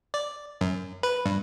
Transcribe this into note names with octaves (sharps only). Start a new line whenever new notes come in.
D5
F#2
B4
G2